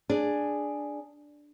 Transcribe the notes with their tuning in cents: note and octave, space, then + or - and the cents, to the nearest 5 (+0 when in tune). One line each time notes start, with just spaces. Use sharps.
D4 +5 G#4 +0